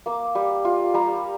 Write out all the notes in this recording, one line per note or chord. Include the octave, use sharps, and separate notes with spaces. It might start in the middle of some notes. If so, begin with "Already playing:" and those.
A#3 D6
G3
F4
G3 A#5